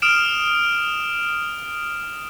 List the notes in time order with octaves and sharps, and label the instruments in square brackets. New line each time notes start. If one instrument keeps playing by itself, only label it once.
[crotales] D#6 F6 D7 E7